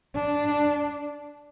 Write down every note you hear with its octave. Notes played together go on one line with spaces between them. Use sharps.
D4